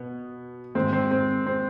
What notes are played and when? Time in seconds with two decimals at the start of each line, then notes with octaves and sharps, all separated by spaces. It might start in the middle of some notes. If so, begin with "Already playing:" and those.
Already playing: B2 B3
0.75 G#2 D#3 C4
0.93 C4
1.11 C4
1.46 C4